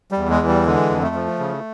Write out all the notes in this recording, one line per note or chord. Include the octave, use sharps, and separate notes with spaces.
G3
E2
G#3
E3
G3
D3 G#3
F2
A3
F3
C#3